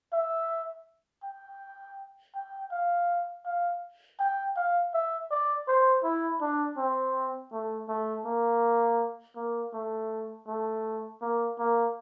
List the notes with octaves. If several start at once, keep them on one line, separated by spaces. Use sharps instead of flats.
E5
G5
G5
F5
F5
G5
F5
E5
D5
C5
E4
D4
C4
A3
A3
A#3
A#3
A3
A3
A#3
A#3